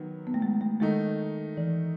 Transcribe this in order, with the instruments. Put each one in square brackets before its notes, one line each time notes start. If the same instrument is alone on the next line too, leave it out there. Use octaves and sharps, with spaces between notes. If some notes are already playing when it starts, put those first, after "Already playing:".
Already playing: [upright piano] D#3 F#3 B3
[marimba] B3
A3
G#3
A3
[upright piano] D#3 A3 D#4 [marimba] G#3
[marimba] E3